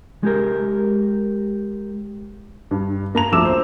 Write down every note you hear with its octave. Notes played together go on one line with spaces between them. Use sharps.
G#3 G4 A#4
G2
A#3 A#5 F7
A#1 F2 A3 D6 E6 E7
C5